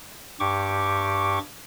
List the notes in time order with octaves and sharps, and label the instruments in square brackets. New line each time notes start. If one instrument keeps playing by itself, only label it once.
[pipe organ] G2 G4 C#6 D6